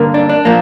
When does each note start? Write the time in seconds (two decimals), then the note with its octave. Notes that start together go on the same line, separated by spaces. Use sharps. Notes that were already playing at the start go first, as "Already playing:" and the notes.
Already playing: G2 D3 A#3
0.14 D4
0.29 D4
0.45 A#2 F3 A#3